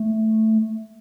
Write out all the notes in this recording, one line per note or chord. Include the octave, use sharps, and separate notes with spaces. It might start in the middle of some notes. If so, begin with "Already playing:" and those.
Already playing: A3